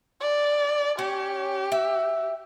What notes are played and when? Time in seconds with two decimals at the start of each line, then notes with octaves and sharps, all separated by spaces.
0.21 D5
0.99 C#4 G4
1.72 E5